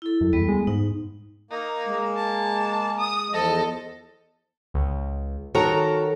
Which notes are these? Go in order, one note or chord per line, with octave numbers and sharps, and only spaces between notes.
E4 A4
F#2
E2 G3 B3
G#3
G#2 D#4
A#3 D#4
G#3
A5
D#6
E2 F3 A4 D#5
C#2
D#3 F#4 A4 A#4 C#5 A#5